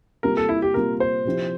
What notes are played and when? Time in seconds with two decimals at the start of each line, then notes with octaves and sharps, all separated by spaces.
0.23 C3 G3 A#3 F4 A#4
0.37 A4
0.49 E4
0.62 G4
0.74 C3 G3 A#3 F4 A#4
1.00 C5
1.25 C3 F3 C4 E4 G4